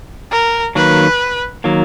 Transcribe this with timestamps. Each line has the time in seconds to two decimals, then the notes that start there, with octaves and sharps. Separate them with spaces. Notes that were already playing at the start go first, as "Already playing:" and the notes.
0.31 A#4
0.75 D#3 F#3 A#3 B4
1.64 D#3 F#3 A#3